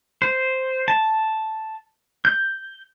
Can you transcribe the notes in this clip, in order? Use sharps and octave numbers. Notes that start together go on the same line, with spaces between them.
C5
A5
G6